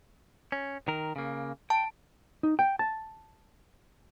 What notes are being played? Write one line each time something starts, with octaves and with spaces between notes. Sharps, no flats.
C#4
D#3 A#4
C#3 A#3
G5 A5
D#4
G5
A5